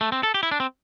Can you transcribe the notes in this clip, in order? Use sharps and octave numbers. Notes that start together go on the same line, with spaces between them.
A3
C4
A4
G4
E4
D4
C4